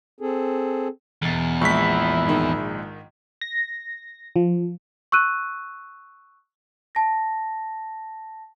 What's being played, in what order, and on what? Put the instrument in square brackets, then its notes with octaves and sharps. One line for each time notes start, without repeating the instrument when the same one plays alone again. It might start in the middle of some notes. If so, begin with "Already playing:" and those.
[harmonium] C4 G#4 A4
[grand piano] E1 A6 [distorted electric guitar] E2
[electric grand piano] A#1 G#3 B6 [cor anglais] E4 [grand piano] C#6
[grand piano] G#2 D#3
[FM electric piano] A#6
F3
[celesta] C#6 E6 F#6 D#7
A5 A#6